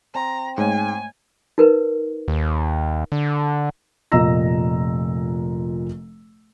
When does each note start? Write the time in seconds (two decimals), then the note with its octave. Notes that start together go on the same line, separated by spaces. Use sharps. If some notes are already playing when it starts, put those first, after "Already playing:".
0.15 C4 A#5
0.58 G#2 G#3 A3 C#5 G#5
1.58 D#4 A#4 B4
2.28 D#2
3.12 D3
4.12 F1 A#2 D#5 A#5 E6 A#6